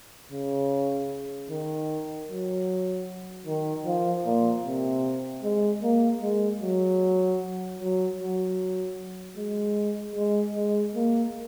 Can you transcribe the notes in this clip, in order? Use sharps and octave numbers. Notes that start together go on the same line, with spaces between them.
C#3
D#3
F#3
D#3
F3
A#2
C3
G#3
A#3
G#3
F#3
F#3
F#3
G#3
G#3
G#3
A#3